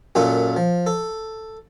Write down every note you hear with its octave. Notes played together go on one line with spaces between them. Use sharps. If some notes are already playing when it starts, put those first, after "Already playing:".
F#2 A#2 F4 A4
F3
A4